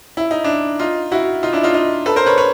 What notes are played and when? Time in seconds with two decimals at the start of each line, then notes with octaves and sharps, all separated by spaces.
0.17 E4
0.31 D#4
0.44 D4 E4
0.79 D#4 F4
1.12 E4 F#4
1.43 D#4 F4
1.53 D4 E4
1.63 D#4 F4
1.74 D#4 F4
2.06 A4 B4
2.16 A#4 C5
2.26 B4 C#5
2.38 B4 C#5